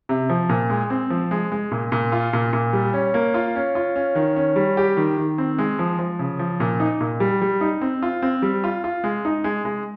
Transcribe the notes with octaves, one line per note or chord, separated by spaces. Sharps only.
C3
F3
A#2
G#3
C4
F3
G#3
G#3
A#2
A#2
F4
A#2
A#2
G3
C#4
A#3
F4
C#4
F4
C#4
D#3
C#4
G3
G4
D#3
D#3
C4
G#3
F3
F3
C#3
F3
A#2
D#4
A#2
G3
G3
D#4
C4
F4
C4
G3
F4
F4
G#3
D#4
G#3
G#3